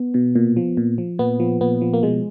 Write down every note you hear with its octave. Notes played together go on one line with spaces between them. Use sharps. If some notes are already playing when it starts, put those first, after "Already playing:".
Already playing: B3
B2
A#2
F3
A#2
F3
A#2 B3
F3
A#2 B3
F3
A#3
B2 G#3